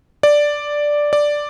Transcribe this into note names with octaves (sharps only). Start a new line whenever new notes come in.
D5
D5